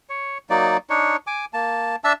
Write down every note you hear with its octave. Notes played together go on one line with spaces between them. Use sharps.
C#5
F#3 A#3 D#4 D5
D4 D#4 C#5
G#5 D6
A#3 A5
D4 E5 A5 E6